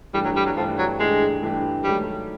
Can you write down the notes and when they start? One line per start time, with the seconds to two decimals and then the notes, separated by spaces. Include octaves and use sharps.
0.14 G2 E3 G3 A3 D4 G4
0.25 F#3
0.36 G3
0.46 F#3
0.56 G2 E3 F3 A3 D4 G4
0.78 F#3
0.99 G2 E3 G#3 A3 D4 G4
1.43 G2 E3 A3 D4 G4
1.84 G#2 D#3 F#3 G3 A3